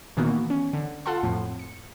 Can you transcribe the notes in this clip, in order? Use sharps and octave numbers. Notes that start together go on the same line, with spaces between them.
A#2 D#3 E3 A#3 B3 F#4
C#4
D3
F4 A4 F#5 A5 C6
F2 A2 F3
C#7